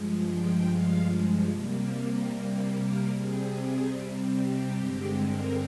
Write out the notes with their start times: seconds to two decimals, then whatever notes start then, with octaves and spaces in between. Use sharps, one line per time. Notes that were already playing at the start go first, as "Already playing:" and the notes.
Already playing: G2 F3 G#3
0.26 G5
0.67 F5
1.50 C3 G3 A#3
2.72 A#4
3.13 C3 G3 C4 G#4
3.55 G#4
4.36 G4
4.77 G2 D3 G#3 C4 G4
5.18 A#4